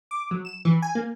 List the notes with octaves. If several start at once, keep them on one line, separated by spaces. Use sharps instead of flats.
D6
F#3
E7
E3
G#5
A#3